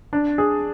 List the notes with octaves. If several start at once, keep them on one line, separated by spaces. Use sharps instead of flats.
D4
G#4